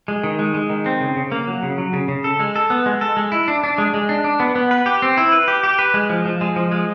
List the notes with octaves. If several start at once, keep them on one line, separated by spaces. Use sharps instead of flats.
G#3
D#3
G#3
G#3
D#3
C4
C#3
C#3
A#3
F#3
C#3
F#3
C#3
C#3
A4
G#3
A4
B3
G#3
A4
G#3
E4
D4
D4
G#3
G#3
D4
D4
B3
B3
B4
G4
C4
E4
B4
G4
G4
B4
G#3
F3
F3
G#3
F3
G#3